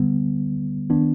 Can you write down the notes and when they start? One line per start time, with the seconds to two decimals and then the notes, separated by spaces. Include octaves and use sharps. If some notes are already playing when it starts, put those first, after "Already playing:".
Already playing: D3 G3 B3
0.90 D#3 B3 D4